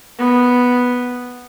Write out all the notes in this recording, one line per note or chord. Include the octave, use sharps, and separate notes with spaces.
B3